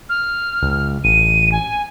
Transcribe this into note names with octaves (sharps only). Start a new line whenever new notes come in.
F6
C#2
A1 D#7
G#5